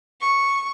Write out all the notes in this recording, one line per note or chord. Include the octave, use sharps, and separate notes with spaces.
C#6